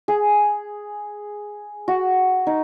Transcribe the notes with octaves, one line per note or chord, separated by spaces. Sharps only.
G#4
F#4
D#4